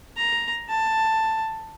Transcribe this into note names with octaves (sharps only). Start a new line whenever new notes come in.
A#5
A5